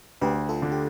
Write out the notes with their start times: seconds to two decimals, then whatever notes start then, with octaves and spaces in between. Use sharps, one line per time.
0.22 D2 G4 B4
0.49 F4 A4
0.62 D3
0.72 G4